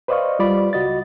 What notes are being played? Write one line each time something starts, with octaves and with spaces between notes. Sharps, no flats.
B4 C5 D5 D#5 F5 C#6
G3 F4 D5 B5
C#2 F#4 D#5 A6